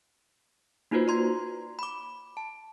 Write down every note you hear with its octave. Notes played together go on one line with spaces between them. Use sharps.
A#3 D#4 F4 F#4 B4 C5
D5 A#5 C6 G#6
B5 D6
A5